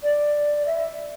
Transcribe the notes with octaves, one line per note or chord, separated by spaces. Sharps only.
D5
E5